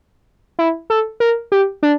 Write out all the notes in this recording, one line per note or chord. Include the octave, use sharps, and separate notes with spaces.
E4
A4
A#4
G4
D4